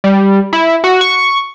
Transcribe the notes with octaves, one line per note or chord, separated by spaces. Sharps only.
G3
E4
F#4
C#6